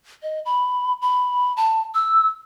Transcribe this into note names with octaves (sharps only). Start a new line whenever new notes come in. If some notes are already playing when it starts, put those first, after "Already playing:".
D#5
B5
B5
A5
E6